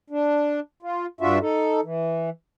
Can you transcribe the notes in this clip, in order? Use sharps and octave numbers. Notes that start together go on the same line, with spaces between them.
D4
F4
G2 D4 F4 F#4 E5
D#4 A4
E3